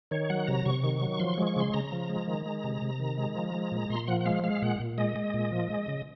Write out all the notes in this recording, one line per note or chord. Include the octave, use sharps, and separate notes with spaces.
D#3 C#5
F#3 F#5
C3 A#5
C3 C#6
D#3
F#3
F3 C6
C#6
G#3
C#6
C#3 C6
C#3 A#5
F3
G#3
D#3
G#3
C3
C3
D#3
G#3
F3
G#3
A#2
A#2 C6
F3 F#5
F#5
G#3 F5
G#3 F5
A#2 F#5
A#2
G#3 D#5
G#3
A#2
F3
G#3
C#3